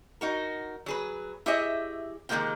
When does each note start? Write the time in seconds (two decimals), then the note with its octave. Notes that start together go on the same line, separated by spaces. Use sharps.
0.21 D#4 F#4 A#4
0.86 F#3 G#4 B4
1.46 E4 G4 G#4 C#5 D#5 E5
2.29 C3 D#3 G#3 A#3 F4 G5